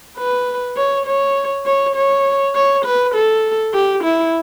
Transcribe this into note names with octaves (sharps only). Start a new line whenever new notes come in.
B4
C#5
C#5
C#5
C#5
C#5
B4
A4
G4
E4